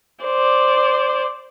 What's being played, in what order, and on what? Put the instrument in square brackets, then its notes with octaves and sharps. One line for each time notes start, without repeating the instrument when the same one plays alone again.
[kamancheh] C5 D5